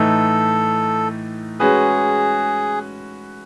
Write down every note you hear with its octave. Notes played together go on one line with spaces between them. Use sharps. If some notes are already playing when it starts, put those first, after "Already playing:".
Already playing: A2 E3 A3 D#4 A4
G#3 C#4 F#4 G#4 B4